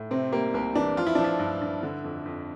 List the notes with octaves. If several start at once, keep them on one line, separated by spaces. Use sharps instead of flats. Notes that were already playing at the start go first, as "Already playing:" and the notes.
Already playing: A2
C3 C4
G3 A#3
C2 A#3
E3 D4
F3 F4
E4
F3 D4
E4
G2
G2
D3
F2
F2